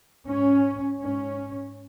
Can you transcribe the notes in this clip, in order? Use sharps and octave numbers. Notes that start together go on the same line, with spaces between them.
G#2 C#4
G#2 C#4